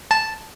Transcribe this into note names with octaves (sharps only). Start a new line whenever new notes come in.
A5